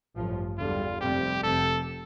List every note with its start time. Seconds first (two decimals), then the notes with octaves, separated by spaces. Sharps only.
0.16 A1 G2 F3
0.58 E2 D3 G3 F4
1.01 F1 F2 C3 G3 C4 G4
1.43 F1 F2 C3 A4